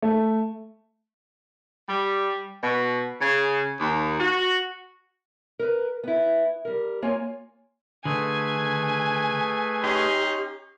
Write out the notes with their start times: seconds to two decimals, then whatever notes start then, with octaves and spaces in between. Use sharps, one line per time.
0.02 A3
1.88 G3
2.63 B2
3.20 C#3
3.80 D#2
4.20 F#4
5.59 A#4 B4
6.04 B3 E4
6.65 G3 A#4
7.02 A#3 F4 C#5 G#5
8.05 D3 A3 G#4 B4 G#5
9.84 C#4 D#4 G4 C6